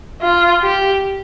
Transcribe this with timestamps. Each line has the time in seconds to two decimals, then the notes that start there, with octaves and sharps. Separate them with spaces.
0.22 F4
0.63 G4